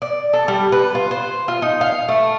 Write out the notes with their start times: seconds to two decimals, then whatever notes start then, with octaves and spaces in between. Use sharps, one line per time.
0.02 D5
0.33 A4
0.48 G3
0.72 B4
0.95 F4
1.11 C5
1.48 F4
1.62 D#4
1.81 F5
2.08 A3